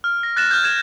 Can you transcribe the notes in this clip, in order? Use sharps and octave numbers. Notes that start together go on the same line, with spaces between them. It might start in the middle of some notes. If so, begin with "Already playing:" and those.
F6
A#6
F#6 A6 A#6 E7
F6 G6
G#6 E7